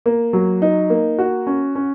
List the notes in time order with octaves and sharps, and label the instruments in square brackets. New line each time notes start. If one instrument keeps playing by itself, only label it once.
[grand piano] A#3
F#3
D#4
A#3
F#4
C#4
C#4